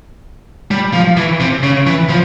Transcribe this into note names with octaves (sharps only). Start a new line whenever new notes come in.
G3
F3
E3
C3
C#3
E3
F3